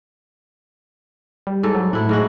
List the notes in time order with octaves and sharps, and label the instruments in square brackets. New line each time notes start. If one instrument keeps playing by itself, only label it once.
[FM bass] G3
[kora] G#2 A4
[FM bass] F#3
[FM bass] A2 [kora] D4 E4
[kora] G#2 G#3 F#4